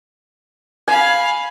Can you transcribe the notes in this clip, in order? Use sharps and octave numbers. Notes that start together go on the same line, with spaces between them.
F5 G#5 B5